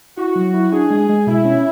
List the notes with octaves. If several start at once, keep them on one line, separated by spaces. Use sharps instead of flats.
E4 F#4
F#3
E4
D4 G#4
G#3
G#3
B2 E4
C#4